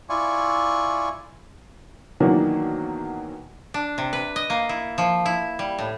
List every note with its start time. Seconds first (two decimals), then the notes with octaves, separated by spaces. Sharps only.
0.09 E4 F4 D5 G#5 C#6
2.20 B2 D#3 E3 F#3 A#3 D4
3.74 D4
3.98 C3
4.13 B4
4.36 D#5
4.50 A#3
4.69 E4
4.98 F3
5.26 E4
5.59 G3
5.79 A2